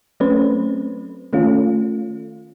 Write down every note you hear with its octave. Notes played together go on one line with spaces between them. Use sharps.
F#3 A3 C4 C#4 B4 C5
D#3 A3 C#4 F4